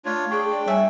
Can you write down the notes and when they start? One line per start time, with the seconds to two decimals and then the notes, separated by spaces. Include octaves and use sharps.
0.05 A3 D4 F4 C#5
0.31 D4 G#4 G5 C#6
0.51 D5
0.68 G3 C#5 E5 G#5